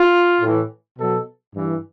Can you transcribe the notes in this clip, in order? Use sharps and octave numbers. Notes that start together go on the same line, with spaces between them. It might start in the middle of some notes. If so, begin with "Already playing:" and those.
Already playing: F4
A2 E3
B2 F#3 A4
G2 E3